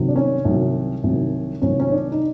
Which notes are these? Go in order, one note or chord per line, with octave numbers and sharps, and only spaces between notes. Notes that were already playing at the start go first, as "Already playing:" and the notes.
Already playing: C2 C3 D#3 F#3
D4
C#4
C2 C3 D#3 F#3
C2 C3 D#3 F#3
C2 C3 D#3 F#3 C#4
C#4
D4
D#4